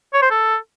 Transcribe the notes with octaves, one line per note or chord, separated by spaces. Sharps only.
C#5
C5
A4